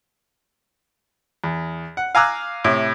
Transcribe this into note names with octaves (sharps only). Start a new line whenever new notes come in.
E2
F#5
F5 G#5 A#5 D6 E6 F#6
A2 C3